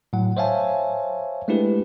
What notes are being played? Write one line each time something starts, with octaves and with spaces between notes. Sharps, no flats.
A2 F#3 F#5
C5 C#5 E5 F5 G#5 A5
G#3 A3 D4 E4 G4 B4